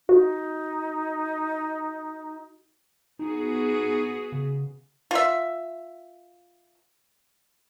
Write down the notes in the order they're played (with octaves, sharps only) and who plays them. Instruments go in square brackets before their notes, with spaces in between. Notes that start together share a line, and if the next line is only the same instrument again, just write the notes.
[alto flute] D#4 [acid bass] F#4
[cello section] B3 F#4 G#4 [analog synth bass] D#4
[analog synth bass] C#3
[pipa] F4 E5